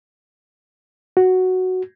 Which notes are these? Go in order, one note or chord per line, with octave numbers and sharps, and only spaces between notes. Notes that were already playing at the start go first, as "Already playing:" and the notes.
F#4